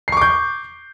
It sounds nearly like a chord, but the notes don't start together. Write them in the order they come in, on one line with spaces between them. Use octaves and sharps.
C7 C#6 D6 G6